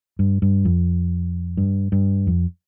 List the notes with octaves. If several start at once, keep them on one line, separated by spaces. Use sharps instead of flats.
G2
G2
F2
G2
G2
F2